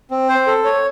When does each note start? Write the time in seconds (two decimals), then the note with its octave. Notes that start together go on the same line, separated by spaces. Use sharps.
0.11 C4
0.29 C5
0.47 A4
0.65 C#5